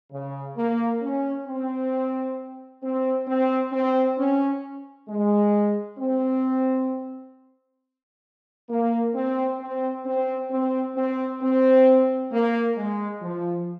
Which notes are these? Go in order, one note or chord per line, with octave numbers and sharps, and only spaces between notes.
C#3
A#3
C#4
C4
C4
C4
C4
C#4
G#3
C4
A#3
C4
C4
C4
C4
C4
C4
A#3
G#3
F3